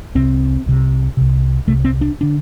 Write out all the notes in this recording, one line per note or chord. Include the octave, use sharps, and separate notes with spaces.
C2 C3 C4
C2 C3
C2 C3
C2 C3 A3
C4
D4
D3 D4